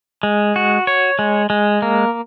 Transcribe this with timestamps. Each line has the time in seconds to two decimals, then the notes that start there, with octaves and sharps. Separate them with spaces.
0.23 G#3
0.56 F#4
0.87 C#5
1.19 G#3
1.50 G#3
1.82 A#3